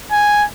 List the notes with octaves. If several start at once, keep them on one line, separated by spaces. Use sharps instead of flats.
G#5